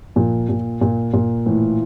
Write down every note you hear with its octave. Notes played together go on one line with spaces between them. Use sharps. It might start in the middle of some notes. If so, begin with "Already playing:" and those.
A#2 F3
A#2
A#2
A#2
A2 E3